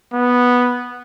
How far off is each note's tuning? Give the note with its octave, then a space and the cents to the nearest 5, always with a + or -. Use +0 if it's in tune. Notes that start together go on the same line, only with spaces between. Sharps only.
B3 -5